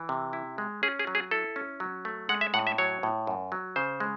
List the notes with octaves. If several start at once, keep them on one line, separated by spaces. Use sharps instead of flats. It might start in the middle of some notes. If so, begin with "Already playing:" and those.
Already playing: E3
C3
E4
G#3
C#4 G#4
G#4
F#3
G#4
E4 A4
C#4
F#3
A3
G#3 F#5
E5
A2 F#5
E5
F#3 C#5
A2
F#2
F#3
C#3 C5
G#3